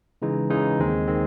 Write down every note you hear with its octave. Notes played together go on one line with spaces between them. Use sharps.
C#3 E3 G#3 D#4
C#3 E3 G#3 D#4
D#2 D#3 G#3 C4
D#3 G#3 C4